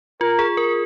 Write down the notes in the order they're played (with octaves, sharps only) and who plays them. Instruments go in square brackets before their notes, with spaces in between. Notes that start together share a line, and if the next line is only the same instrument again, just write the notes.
[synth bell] F4 [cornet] A#4
[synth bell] G#4
A#4